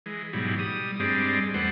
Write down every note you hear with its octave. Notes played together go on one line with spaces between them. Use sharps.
E3 G#3
G#2 B2 E3 F#3 G3
G3 D#6
G2 G3 G#3 C4 D5
E2 A3 B3 G4 C5 F#5